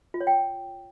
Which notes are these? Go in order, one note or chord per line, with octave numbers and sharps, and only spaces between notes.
F4
C#5
G5